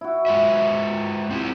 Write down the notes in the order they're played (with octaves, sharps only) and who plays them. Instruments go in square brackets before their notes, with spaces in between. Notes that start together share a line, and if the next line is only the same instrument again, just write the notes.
[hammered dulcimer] E4 F#4
[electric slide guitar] G#3 F4 E5
C4 E4 G4